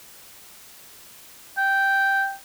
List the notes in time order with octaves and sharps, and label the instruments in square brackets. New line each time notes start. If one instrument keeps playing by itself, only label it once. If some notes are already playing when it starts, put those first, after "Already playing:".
[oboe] G5